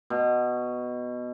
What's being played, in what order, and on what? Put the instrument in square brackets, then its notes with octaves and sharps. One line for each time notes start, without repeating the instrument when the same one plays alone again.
[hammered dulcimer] B2